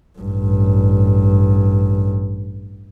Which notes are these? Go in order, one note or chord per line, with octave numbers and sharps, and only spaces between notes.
A1 G2